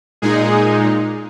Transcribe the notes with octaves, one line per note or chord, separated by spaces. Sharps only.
A#2 G#3 D#4 G#4